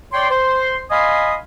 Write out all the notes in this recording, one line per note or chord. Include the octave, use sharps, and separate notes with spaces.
C#5 D5 G5 C6
C5 C6
D#5 F5 G#5 B5 C6 D#6